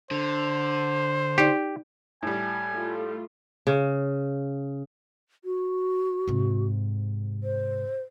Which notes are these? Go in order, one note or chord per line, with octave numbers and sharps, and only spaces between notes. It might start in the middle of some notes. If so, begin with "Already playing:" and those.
D3 C5
D#4 G4 D5
A2 G3 G#5
A3 F4
C#3
F#4
G#2 C3
C5